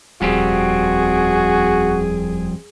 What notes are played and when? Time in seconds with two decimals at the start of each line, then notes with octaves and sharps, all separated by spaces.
0.21 D#1 F2 G3 C4 F#4 G#4